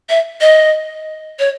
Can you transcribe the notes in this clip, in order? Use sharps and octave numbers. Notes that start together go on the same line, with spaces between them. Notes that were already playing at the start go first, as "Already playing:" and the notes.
E5
D#5
C#5